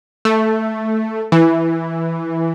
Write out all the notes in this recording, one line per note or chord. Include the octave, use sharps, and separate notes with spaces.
A3
E3